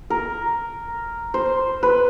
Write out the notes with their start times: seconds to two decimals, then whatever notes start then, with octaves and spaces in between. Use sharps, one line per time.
0.10 A#4
1.34 C5
1.83 B4